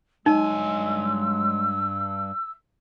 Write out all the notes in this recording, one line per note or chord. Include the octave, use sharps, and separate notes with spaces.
G2 F#3 G#3 D#4 G#5 E6